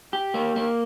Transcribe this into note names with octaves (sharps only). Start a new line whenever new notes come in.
G4
A#3
A#3